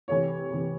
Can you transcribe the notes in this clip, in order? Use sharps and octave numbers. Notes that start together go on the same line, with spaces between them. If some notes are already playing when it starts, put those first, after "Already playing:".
C3 E3 C#5
C3 E3